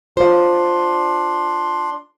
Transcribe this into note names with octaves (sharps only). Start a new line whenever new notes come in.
D4 F4 C5 F5 C6